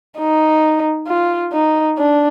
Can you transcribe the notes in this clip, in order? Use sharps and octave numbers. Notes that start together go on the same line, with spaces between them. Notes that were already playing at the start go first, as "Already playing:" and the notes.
D#4
F4
D#4
D4